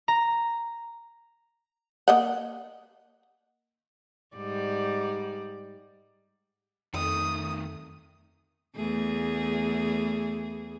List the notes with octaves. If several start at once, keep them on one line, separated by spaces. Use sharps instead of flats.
A#5
A#3 D#5 F#5
G#2 G3 D5
F2 D#3 A3 D#6
E2 A3 G#4